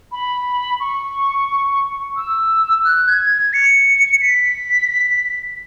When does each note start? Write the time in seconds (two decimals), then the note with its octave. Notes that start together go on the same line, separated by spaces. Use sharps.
0.12 B5
0.80 C#6
2.16 E6
2.84 F#6
3.07 G#6
3.30 G#6
3.53 C#7
4.21 B6